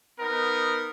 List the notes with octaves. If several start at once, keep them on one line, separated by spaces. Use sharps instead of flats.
B3 D#4 A#4